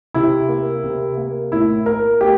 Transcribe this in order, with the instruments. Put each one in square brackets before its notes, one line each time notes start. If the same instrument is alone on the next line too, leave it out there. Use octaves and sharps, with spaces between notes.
[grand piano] C3 E4
A#3
C3
A#3
A2 E4
A#3 A#4
A3 G4